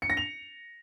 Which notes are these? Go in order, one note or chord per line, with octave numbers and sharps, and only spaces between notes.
C#7
A#6
F7